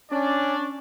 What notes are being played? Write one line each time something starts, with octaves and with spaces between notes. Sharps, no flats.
C#4 D4 D5